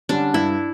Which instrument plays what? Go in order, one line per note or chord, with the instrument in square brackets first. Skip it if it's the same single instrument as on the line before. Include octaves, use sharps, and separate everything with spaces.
[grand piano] D3 G3 C#4 [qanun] D4
[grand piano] G2 [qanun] E4